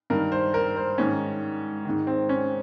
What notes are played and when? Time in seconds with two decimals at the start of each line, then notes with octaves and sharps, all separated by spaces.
0.10 G2 D#3 A#4
0.32 C5
0.54 A#4
0.76 C5
0.98 G#2 D#3 C#4
1.85 G#2 D#3
2.07 C4
2.29 C#4